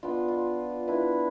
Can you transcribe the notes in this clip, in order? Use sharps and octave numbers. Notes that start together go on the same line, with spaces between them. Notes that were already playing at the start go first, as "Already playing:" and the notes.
B3 D4 F4
F4
D4 E4 B4